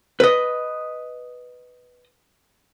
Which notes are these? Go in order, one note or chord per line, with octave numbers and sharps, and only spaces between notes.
B4 D#5